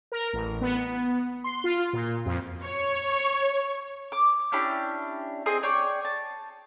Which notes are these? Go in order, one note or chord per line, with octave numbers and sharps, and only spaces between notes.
A#4
A1
B3
B3
C6
F4
A#2
F2
C#5
D6
C#4 D4 E4 G4
C4 G#4 D#5 D#6
C#5 D5 G5 C#6
A5